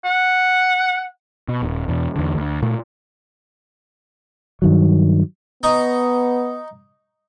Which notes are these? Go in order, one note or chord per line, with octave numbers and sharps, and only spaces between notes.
F#5
B2
D#1
E2 B2
E2 D3
D2
A#2 A3
G2 D#3 F#3
B3 D#4 A#5 C#6